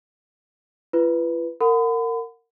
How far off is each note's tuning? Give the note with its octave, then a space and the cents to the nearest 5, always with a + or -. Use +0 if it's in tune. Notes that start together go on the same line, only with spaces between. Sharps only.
F4 -45 B4 +0
A#4 -25 F#5 -20 B5 +40